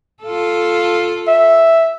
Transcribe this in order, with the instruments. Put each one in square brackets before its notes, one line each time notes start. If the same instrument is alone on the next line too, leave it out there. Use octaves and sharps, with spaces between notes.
[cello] F4 A4
[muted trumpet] E5